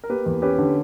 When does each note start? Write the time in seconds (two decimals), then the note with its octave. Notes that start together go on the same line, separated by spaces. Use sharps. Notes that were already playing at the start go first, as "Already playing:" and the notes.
0.04 A#4
0.10 A#3 G4 B4
0.26 E2
0.42 C#4 G4 B4
0.58 D3